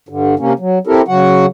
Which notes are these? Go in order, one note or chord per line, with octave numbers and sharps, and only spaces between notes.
G2 D3
C3 A#3 C#4
F#3
C4 E4 G4 A4 A#4
C#3 F#3 F#4 F#5